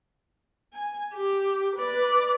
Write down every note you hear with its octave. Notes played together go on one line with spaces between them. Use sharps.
G#5
G4
B4 D5